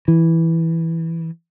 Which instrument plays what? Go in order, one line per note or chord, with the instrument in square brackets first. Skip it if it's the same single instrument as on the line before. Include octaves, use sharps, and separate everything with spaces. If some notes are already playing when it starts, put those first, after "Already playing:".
[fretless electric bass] E3